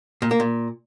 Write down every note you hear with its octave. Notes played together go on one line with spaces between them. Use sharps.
A#2
A#3
A#2